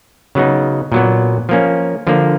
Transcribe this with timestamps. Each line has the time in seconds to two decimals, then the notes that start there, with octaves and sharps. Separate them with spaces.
0.35 C#3 F#3 B3 D#4
0.92 A#2 F#3 B3
1.49 F3 A#3 C#4
2.07 D3 F3 A#3